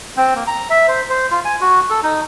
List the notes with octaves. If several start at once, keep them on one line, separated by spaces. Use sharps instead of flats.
C4
A#3
A#5
E5
C5
C5
F4
G#5
F#4
A4
D#4